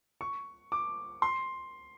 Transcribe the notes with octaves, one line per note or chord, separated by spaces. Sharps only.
C#6
D6
C6